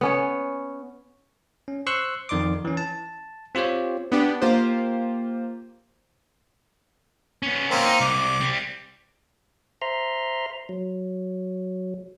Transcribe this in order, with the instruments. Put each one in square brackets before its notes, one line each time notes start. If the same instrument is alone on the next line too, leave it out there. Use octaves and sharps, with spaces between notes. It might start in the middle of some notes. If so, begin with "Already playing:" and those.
[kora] B3 C#4 C#5
[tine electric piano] C#4
C5 C6 C#6 E6 F#6
F2 D#3 D5 C6 D6
E3 C#4
A5
C4 F4 G4 C5 C#5
[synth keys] B3 D4 G4
A#3 F4 G4 C5
[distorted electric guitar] B3 C#4
[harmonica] A#3 C4
[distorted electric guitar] D#4
[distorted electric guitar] C2 [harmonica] D6
[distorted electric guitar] G3 C4
[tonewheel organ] C5 E5 A#5 C6 F6
F#3